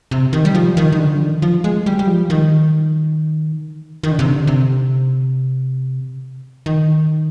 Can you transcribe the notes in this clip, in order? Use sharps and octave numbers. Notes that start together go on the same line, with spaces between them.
C3
D#3
G3
F3
D#3
D#3
D3
F3
D#3
F3
G#3
G3
G3
F3
D#3
D#3
D3
C3
D3
C3
D#3